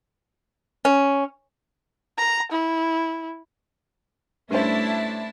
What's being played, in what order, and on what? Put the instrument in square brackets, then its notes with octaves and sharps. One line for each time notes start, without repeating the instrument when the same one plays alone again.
[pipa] C#4
[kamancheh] A#5
E4
[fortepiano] G2 C#4 C5 [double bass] A3 [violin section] D4 E4 A5 [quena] E5